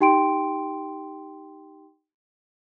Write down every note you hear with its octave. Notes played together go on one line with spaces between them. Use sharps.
D#4 G4 G5 C6 D7